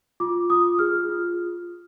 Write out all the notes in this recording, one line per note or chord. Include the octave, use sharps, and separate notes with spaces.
F4 D6
F4 D#6
G#4 F6
F4